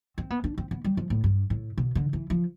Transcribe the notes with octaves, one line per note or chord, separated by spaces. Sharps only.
C4
B3
D4
C4
B3
G3
F3
A2
G2
A2
B2
D3
E3
F3